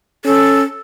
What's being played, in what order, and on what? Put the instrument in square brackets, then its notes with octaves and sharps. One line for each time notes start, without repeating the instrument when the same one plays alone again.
[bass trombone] C#4 [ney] A4